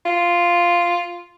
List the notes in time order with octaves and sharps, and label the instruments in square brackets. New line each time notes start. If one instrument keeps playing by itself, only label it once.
[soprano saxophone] F4